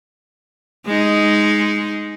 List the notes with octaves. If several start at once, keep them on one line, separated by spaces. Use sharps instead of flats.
G#3 D#4